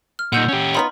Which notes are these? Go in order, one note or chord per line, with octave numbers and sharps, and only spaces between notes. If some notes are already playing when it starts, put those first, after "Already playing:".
F6
A#2 D#4 F#5 E6 G6
C#4 G4
B3 D#4 F4 B5